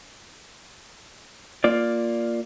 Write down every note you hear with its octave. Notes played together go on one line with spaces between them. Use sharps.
A#3 F4 D5